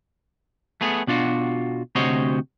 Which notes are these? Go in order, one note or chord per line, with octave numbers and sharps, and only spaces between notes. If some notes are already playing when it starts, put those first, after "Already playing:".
A3 B3 G#4
B2 D4 F4 F#4
D2 C3 F#4 C5 C#5 D#5